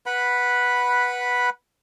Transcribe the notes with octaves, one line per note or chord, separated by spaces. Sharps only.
B4 F#5 B5